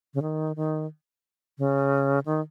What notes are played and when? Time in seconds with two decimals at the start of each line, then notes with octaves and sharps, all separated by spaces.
0.14 C#3
0.22 D#3
0.56 D#3
1.58 C#3
2.26 D#3